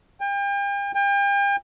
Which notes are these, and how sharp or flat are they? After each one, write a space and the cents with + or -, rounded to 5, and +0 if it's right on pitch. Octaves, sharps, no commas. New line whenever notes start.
G5 +40
G5 +40